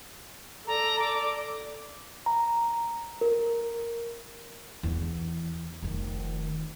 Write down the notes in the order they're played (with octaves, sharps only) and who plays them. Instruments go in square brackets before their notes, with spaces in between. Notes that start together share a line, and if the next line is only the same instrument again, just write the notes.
[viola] A4 D5 [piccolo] A#5
[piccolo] D6
[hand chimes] A#5
A#4
[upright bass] E2 E3
F1 D#3